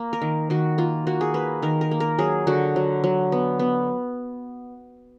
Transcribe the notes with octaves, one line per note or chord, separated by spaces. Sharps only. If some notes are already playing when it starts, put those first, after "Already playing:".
Already playing: A#3
A#4
D#3
D#3 F#4
A#3 F4
A#3 F#4
G#4
A#3 B4
D#3 A#4
A#4
A#3
A#4
F#3 G#4
D3 F#4
F#3
F#3
B3
B3